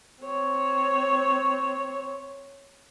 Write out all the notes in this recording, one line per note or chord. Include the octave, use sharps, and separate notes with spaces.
C4 C#5